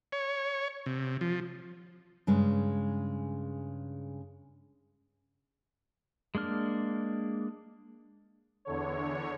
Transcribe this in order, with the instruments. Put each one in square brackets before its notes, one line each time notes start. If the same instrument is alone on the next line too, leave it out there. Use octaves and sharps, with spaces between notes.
[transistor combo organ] C#5
C3
F3
[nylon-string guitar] G2 C#3 G#3
[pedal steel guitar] G#3 A#3 D4 F6
[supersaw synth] E2 D3 C#5